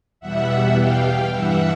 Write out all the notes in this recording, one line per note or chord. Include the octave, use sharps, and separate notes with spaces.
E2 B2 G3 E5 F#5
F5 G5
G2 E3 G3 E5 F#5